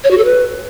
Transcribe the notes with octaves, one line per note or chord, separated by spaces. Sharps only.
C#5
F#4
A4
B4